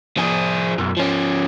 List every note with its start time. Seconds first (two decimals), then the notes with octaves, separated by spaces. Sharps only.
0.17 F3 G#4
0.78 B1 F#2
0.97 F3 C#4